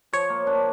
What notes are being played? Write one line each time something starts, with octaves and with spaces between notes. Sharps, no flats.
F3 C#5
A#3
D4